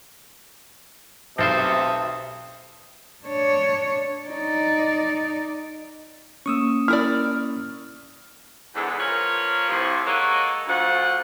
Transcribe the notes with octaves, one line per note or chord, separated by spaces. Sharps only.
B1 C3 C4 A4 C5 E5 A5 D#6
D4 C#5
D#4 D5
A#3 C#4 C#6 D#6 E6
E4 A#4 D5 F6
E2 G#2 D3
F3 A#3 A#4 B4 C#5
A2 C3 F3
G#3 A#3 A4 C#5 D#5 F#5
D2 F3 F#5